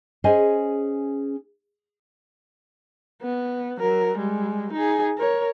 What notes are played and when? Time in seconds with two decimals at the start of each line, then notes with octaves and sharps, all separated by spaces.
0.24 C#4 G#4 C5 D#5 G#5
3.22 B3
3.80 F#3 A#4
4.17 G3 G#3
4.73 D#4 G#4
5.18 A#4 C#5